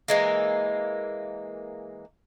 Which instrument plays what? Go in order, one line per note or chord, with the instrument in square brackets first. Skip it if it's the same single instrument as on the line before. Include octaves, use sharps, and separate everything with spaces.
[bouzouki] E3 G#3 A#3